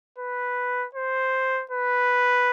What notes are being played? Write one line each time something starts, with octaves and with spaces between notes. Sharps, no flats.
B4
C5
B4